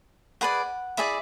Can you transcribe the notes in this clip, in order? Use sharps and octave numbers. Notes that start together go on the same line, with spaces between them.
G#4 B4 D5 F#5
E4 G#4 D5 E5